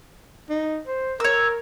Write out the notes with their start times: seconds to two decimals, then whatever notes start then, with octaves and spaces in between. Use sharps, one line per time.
0.50 D#4
0.87 C5
1.20 A#4 C#5 E6